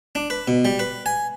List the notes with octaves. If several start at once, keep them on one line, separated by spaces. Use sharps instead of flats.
D4
B4
B2
G3
B4
G#5